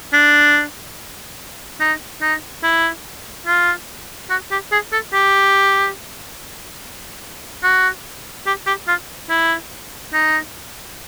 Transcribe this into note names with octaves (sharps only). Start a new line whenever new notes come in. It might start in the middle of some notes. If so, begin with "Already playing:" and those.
D4
D#4
D#4
E4
F4
F#4
G4
G#4
A4
G4
F#4
G4
G4
F4
E4
D#4